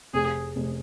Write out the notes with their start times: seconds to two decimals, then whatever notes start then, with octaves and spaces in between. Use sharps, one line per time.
0.14 F1 G#4
0.56 F1